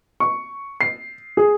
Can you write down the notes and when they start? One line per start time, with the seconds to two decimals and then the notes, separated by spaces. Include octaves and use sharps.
0.20 C#6
0.81 C7
1.37 G#4